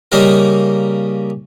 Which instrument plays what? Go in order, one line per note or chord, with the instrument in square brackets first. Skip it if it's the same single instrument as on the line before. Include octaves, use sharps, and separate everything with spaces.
[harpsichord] C#3 G3 A#3 D#4 A#4